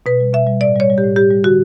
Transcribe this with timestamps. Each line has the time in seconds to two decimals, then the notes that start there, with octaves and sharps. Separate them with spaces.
0.06 B2 B4
0.20 G3
0.33 B2 E5
0.47 G3
0.61 A2 D5
0.75 G3 C#5
0.90 G3
0.98 G4
1.03 A2
1.16 G3 G4
1.30 G3
1.44 D3 F#4